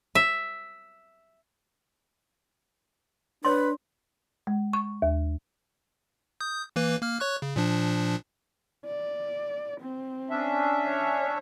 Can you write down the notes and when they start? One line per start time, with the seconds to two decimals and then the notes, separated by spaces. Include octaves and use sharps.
0.15 E5
3.45 D4 B4 C#5 C6
4.47 G#3
4.73 C#6
5.02 D#2
6.40 D#6 G6
6.76 E3 A#3 B4
7.02 A#3 F6
7.20 C#5 C#6 F#6
7.42 C#3
7.56 A#2 F3 D4
8.85 D5
9.81 C4
10.30 C#4 D4 E5
10.88 C#5